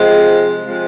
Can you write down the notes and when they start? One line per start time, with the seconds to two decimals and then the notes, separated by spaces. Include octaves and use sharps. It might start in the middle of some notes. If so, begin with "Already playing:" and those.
Already playing: C3 F3 G#3
0.66 C3 F3 G#3